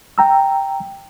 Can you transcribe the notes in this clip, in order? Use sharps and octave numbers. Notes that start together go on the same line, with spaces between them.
G5 A#5 E6